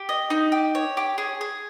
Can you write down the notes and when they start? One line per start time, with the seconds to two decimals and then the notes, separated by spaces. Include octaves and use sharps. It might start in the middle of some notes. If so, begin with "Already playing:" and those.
Already playing: G4
0.09 D#5
0.30 D#4
0.52 G4
0.75 C#5
0.97 G4
1.18 G#4
1.41 G#4